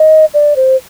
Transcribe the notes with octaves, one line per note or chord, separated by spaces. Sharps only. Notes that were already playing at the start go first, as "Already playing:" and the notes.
Already playing: D#5
D5
C5